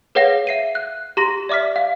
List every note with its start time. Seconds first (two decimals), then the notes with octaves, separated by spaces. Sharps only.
0.15 G#4 B4 C#5 F5 F#5 A#6
0.47 E5 C7 D#7
0.75 F#6
1.17 G4 A#5 C6 A#6
1.49 D5 E5 D6 F6 B6
1.76 F5